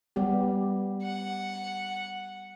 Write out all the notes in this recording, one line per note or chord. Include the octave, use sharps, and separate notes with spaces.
G3 B3 G4
F#5